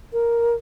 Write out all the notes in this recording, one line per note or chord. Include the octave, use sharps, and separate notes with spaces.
A#4